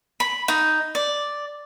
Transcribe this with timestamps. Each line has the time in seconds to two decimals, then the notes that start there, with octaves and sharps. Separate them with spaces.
0.20 B5
0.48 D#4
0.95 D5